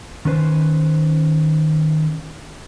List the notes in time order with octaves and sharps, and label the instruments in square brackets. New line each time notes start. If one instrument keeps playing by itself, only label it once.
[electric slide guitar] D#3 C#4 B4 C5